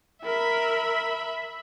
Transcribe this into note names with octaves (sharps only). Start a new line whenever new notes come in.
A#4 E5 B5